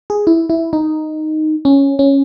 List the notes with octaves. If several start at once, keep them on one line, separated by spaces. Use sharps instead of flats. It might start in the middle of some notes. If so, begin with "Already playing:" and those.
G#4
E4
E4
D#4
C#4
C#4